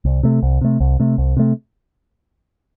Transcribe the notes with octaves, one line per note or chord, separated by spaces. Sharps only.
C2
C3 A3
C2
C3 A3
C2
C3 A3
C2
C3 A3